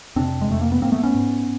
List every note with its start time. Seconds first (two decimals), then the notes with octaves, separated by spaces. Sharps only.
0.16 F2 C3 C4 D4
0.41 G#3
0.49 F2 C3 A3
0.61 A#3
0.72 B3
0.81 G#2 A#3 C4
0.92 A3 B3
1.03 B3 C#4
1.15 G#2